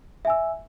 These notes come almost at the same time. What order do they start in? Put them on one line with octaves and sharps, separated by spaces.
E5 G#5 E6